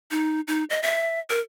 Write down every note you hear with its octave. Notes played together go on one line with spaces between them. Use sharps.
D#4
D#4
D#5
E5
A#4